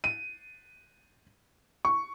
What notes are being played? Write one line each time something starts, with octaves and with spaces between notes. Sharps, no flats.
D#7
C#6